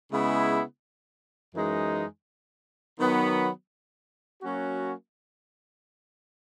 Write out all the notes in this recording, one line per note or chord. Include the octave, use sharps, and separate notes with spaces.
C#3 G#3 B3 E4
F#2 E3 G#3 D#4
D#3 F#3 B3
F#3 A#3 C#4 F#4